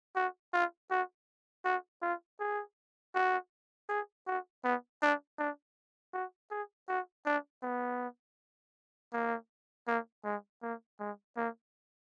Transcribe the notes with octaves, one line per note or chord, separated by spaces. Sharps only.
F#4
F4
F#4
F#4
F4
G#4
F#4
G#4
F#4
B3
D4
D4
F#4
G#4
F#4
D4
B3
A#3
A#3
G#3
A#3
G#3
A#3